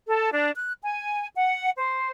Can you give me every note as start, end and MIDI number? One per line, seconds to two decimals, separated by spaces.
0.07 0.30 69
0.33 0.51 62
0.56 0.72 90
0.82 1.26 80
1.34 1.69 78
1.77 2.10 72